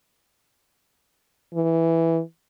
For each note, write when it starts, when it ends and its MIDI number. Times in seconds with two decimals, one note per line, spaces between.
1.55 2.22 52